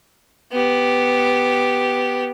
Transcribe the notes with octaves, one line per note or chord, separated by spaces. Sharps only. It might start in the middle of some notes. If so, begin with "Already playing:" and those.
B3 G4